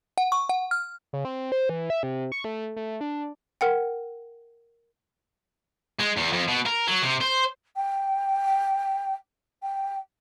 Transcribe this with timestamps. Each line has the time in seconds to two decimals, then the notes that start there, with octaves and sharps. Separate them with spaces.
0.18 F#5
0.32 C#6
0.49 F#5
0.71 F6
1.13 C#3
1.25 C4
1.52 C5
1.69 E3
1.90 E5
2.03 C3
2.32 C#6
2.44 A3
2.76 A3
3.01 D4
3.61 A#4 F#5 G5
5.99 G#3
6.17 E2
6.32 F2
6.48 B2
6.66 A#4
6.88 F#3
7.02 C3
7.21 C5
7.76 G5
9.62 G5